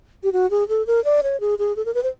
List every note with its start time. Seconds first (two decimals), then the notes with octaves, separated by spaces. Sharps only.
0.23 G4
0.33 F#4
0.51 G#4
0.69 A4
0.87 A#4
1.05 D5
1.23 C#5
1.40 G#4
1.59 G#4
1.76 A4
1.85 A#4
1.94 B4
2.03 C5